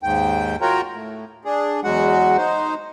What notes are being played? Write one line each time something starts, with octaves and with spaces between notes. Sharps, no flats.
D#2 G#2 G5
F4 F#4 A#4 C#5 G5 A#5
A2
D4 G#4
E2 F#3 G#3 F#4 F#5
D#4 C5